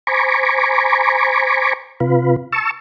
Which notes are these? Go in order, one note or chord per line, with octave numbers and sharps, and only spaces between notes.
C5 G#5 A#5 B5 C#6 D6
C3 F4 B4
A5 C#6 E6